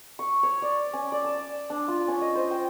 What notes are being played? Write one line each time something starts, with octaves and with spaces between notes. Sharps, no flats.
C#6
C#5
D5
C#4
D5
A5
D4
F4
C#4
D#5
C5
G5